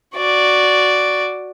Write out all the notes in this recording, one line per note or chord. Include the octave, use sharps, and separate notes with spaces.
F#4 D5